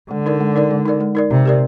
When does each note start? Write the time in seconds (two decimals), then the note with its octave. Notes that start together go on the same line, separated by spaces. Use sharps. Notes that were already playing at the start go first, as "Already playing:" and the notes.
0.11 D3 G#3
0.26 D#4 A#4 D5
0.40 G#3
0.56 D#4 A#4 D5
0.71 G#3
0.86 D#4 A#4 D5
1.00 G#3
1.15 D#4 A#4 D5
1.31 C3 C4
1.46 G4 A#4 D5